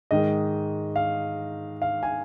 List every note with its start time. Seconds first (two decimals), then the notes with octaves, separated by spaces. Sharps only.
0.11 G#2 D#3 G#3 D#5
0.96 F5
1.82 F5
2.03 G#5